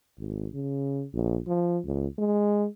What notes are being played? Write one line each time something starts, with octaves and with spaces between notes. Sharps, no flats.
G#1
C#3
A#1
F3
C#2
G#3